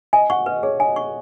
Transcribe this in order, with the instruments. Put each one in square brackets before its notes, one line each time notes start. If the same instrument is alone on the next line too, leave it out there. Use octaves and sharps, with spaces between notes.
[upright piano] D#5 [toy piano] G#5
[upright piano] F#5 [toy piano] C#6
[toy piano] B4 [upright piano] D#5
[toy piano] G#4 [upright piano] C#5
[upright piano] D#5 [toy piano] G#5
[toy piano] C#6